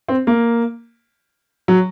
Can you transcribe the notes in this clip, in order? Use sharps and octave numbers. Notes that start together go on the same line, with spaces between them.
C4
A#3
F#3